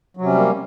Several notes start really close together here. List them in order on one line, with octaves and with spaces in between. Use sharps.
F#3 C3 C#4 G3 A#3